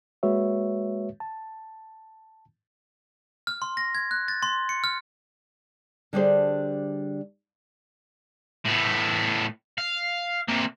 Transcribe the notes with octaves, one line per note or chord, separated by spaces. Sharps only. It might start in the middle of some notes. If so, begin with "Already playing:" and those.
G#3 A#3 F#4 B4 C#5 E5
A5
F6
C6
A#6
G#6
F#6
A6
C6
C#7
F6
D3 G3 D4 G4 G#4 C5
A2 B3
F5
C3 A#3